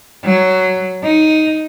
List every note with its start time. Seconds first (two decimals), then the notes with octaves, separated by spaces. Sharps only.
0.24 F#3
1.04 D#4